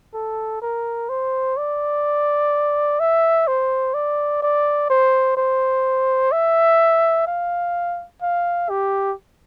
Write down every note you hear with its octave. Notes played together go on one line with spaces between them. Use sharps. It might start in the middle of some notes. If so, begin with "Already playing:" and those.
A4
A#4
C5
D5
E5
C5
D5
D5
C5
C5
E5
F5
F5
G4